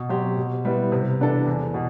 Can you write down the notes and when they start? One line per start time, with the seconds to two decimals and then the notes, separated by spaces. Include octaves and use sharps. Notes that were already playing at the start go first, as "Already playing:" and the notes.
Already playing: B2
0.09 F#3 C4 G4 C5
0.37 B2
0.65 G3 B3 E4 B4
0.92 C3
1.20 E3 B3 D4 A4
1.46 E2
1.74 B2